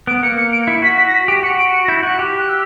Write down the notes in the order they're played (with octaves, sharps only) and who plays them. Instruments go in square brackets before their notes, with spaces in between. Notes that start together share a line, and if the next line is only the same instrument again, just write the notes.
[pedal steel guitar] B3 [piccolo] D7
[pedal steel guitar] A#3 [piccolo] C#7
[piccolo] C#7
D7
[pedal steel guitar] E4 [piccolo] C#7
[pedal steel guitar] F#4 [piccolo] B6
[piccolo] B6
A#6
B6
[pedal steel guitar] G4 [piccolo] D7
[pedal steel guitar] F#4 [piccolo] C#7
[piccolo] D7
C#7
A#6
[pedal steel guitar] E4 [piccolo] G6
[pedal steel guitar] F#4 [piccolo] F#6
[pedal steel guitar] G4
[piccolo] F#6
E6